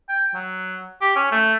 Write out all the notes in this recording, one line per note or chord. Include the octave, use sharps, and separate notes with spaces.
G5
F#3
G4
C#4
A3